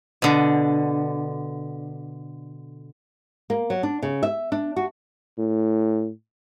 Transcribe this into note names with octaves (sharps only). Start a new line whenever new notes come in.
B2 D3
A#3
F#3
D4
C#3
E5
D4
F#4
A2